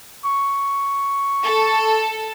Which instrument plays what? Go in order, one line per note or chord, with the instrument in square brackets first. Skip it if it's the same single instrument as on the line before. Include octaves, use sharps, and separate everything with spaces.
[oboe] C#6
[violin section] A4